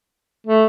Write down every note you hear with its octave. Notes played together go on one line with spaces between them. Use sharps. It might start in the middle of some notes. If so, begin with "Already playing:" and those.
A3